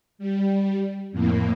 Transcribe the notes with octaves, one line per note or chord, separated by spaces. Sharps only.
G3
F2 A2 A#3